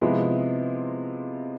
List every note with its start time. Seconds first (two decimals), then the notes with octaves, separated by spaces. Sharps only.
0.01 C3 F3 G#3 B3 E4